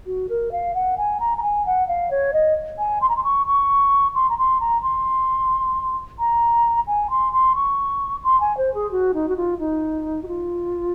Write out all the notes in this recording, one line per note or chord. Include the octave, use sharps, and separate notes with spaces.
F#4
A#4
F5
F#5
G#5
A#5
A#5
G#5
F#5
F5
C#5
D#5
G#5
C6
A#5
C6
C#6
C#6
C6
A#5
C6
A#5
C6
A#5
G#5
C6
C6
C#6
C6
G#5
C5
G#4
F#4
D#4
F#4
F4
D#4
F#4
F4